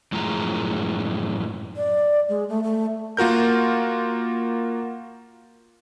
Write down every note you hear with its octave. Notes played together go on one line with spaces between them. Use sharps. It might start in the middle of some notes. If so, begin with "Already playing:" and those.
F#2 A2 F3 G#3 A#5
D5
G#3
A3
A3
A#3 F4 F#4 A#4 G6